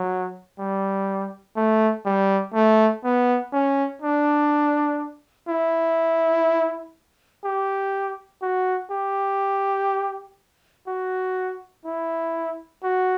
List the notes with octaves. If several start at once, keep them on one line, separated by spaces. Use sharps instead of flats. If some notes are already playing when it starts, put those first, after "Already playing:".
Already playing: F#3
G3
A3
G3
A3
B3
C#4
D4
E4
G4
F#4
G4
F#4
E4
F#4